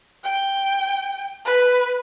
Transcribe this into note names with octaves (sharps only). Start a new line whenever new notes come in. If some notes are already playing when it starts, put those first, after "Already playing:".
G5
B4